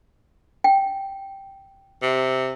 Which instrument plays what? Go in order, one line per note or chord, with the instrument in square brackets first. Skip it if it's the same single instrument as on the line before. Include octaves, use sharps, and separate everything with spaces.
[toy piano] G5
[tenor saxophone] C3